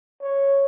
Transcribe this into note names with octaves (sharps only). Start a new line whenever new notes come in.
C#5